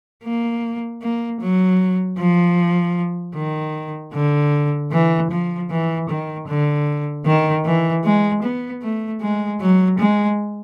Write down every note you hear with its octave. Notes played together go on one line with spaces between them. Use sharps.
A#3
A#3
F#3
F3
D#3
D3
E3
F3
E3
D#3
D3
D#3
E3
G#3
B3
A3
G#3
F#3
G#3